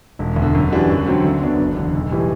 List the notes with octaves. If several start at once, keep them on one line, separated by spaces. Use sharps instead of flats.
E1
D2
D3
F#2
E3 G3 D4 F#4
F#2
D3 F#3 C4
D2
D3 F#3 B3 D4
F#1
E2 D3
B1
A2 E3 G3